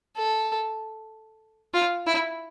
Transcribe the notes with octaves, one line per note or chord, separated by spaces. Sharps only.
A4
F4
E4